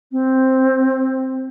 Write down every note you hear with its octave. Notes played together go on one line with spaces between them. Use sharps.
C4